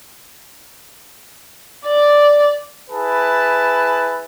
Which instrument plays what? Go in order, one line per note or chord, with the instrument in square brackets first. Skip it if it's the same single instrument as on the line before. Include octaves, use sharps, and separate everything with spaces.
[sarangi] D5
[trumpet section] E4 G#4 B4 A5